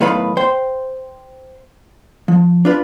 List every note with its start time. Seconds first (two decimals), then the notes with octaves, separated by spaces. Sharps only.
0.01 B1 A2 D#3 B4 F5 B5
0.37 C5 G5
2.28 F3
2.65 D4 F4 B4